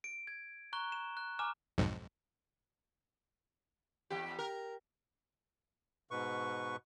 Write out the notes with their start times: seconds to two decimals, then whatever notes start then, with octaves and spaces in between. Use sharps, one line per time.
0.04 D7
0.27 G#6
0.73 A#5 C#6 F#6 G7
0.92 E7
1.17 F#6
1.39 G#5 A#5 D6 F6 E7
1.78 B1 F2 G#2
4.10 E2 G4
4.39 A#4
6.11 G#2 B2 B4 C#6